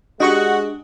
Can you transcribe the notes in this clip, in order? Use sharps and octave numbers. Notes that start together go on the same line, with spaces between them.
G#3 D4 F#4 G4 D#5 C#6